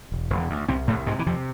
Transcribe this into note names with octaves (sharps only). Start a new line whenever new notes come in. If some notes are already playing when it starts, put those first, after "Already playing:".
E1
E1
D2
C2 C3 C4
C2 A2 A3
G#2 C3 G#3
E3
F2 C3 F3